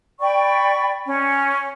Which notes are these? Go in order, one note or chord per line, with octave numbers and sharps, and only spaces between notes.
D5 G5 B5 C#6
C#4